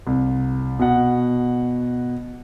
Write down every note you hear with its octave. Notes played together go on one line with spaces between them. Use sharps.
C2
B2 F#5